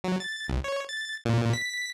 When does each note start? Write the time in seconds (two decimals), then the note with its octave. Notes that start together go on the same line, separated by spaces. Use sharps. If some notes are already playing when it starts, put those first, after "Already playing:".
0.04 F#3
0.20 A6
0.48 C2
0.64 C#5
0.89 A6
1.25 A#2
1.53 B6